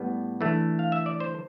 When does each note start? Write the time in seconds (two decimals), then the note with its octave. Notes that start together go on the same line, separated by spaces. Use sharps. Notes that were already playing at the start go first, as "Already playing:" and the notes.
Already playing: A2 G3 B3
0.41 E3 A3 D4
0.79 F5
0.92 E5
1.06 D5
1.20 C5